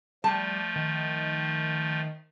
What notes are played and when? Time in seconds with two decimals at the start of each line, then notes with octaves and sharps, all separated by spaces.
0.24 F3 G3 A3 A5
0.75 D#3